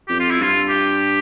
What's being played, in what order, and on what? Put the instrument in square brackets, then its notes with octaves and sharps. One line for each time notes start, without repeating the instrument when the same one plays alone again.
[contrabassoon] F2 [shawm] G4
[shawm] F4
E4
[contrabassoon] G2 [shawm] F4
[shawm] G4